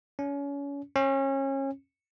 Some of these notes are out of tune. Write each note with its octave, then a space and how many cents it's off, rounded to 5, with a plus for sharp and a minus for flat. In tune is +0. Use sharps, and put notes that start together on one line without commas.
C#4 +30
C#4 -30